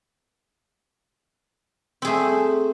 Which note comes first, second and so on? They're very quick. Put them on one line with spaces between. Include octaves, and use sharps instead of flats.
C4 G#4 A3